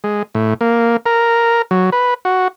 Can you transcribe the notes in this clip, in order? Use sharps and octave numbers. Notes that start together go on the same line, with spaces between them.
G#3
A2
A#3
A#4
F#3
B4
F#4